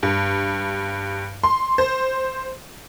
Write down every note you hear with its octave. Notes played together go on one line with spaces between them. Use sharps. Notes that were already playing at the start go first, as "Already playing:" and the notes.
G2
C6
C5